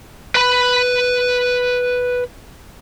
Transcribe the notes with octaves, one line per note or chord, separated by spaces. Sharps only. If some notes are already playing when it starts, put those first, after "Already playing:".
B4 B5